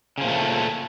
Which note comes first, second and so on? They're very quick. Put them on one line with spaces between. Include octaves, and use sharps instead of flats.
C#3 F3 A#2 A3